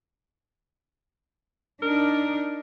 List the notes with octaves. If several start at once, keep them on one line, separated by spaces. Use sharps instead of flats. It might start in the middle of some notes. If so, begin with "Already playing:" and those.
D4 D#4 A#4